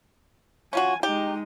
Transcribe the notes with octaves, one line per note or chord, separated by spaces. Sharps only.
C#4 F4 F#4 G#5
G#3 D#4 G4